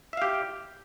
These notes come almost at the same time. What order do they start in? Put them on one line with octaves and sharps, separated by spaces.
E5 F5 G4